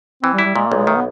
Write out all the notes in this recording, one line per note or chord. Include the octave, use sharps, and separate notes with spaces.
E3 C4
G3
E4
G3
A#2 G#3
A#3
B1
G#3
D#3 A3
B3